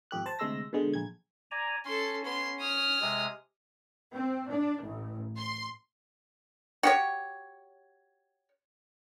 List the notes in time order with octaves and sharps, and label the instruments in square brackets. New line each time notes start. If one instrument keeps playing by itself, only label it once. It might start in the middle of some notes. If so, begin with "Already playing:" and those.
[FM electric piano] G#1 F2 G4 F#6
C5 A5
D2 C3 G#3 C6 E6 A#6
B2 D3 G#3
A#1 G#6
[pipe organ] D5 G#5 A#5
[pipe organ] C#4 [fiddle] A4 C6
[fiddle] B3 C6
D#6 F6
[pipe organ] C3 G#3
[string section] C4
D4
A1
C6
[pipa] F#4 G4 C#5